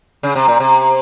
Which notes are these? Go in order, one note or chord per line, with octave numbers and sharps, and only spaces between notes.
C#3
C3
A#2
C3